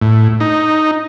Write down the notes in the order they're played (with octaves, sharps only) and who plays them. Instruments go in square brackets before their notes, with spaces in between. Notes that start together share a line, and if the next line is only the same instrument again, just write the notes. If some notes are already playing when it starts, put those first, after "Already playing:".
[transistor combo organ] A2
D#4